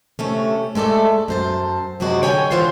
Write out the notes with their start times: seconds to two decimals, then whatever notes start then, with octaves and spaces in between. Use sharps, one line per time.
0.19 C3 A3 C#4
0.75 G#3 A3 A4 D5 E5
1.28 F#2 C5 A5
2.00 F#2 C3 F#3 G#3 F#4 D5
2.22 D3 C#5 G5 G#5
2.51 G2 E3 F4 C5 F5 F#5